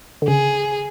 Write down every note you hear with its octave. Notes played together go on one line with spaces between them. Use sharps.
D3
C#3 G#4